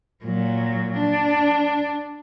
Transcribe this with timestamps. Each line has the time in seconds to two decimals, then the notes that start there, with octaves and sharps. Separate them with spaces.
0.24 A#2 F#3
0.97 D4